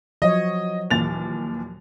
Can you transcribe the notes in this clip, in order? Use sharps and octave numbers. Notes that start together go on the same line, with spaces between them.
F3 F#3 C#5 D#5
D#2 A#2 E3 A6 F7